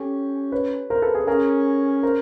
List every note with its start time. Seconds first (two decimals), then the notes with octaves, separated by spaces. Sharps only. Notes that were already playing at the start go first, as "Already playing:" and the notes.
Already playing: C#4 G4 A4
0.52 B4 C#5
0.90 A#4 C5
1.02 A4 B4
1.15 G#4 A#4
1.27 C#4 G#4 A#4
2.03 A#4 C5